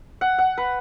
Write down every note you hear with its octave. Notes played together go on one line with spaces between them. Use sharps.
F#5
F#5
B4